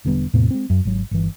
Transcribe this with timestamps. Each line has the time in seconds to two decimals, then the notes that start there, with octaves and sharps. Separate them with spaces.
0.05 E1 D3 G3 B3
0.33 E2 A2 C3 B3
0.51 G#3 C4
0.70 F#2
0.85 G#1 F#3
1.11 G1 E3